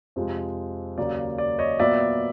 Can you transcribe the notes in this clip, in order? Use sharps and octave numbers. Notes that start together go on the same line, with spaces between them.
F2 C3 F3 G#3
D#2 C#3 F#3 A#3 D5
D5
C#5 D#5
A#2 F#3 B3 D5 E5